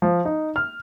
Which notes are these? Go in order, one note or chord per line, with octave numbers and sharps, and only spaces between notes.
F3
D#4
F6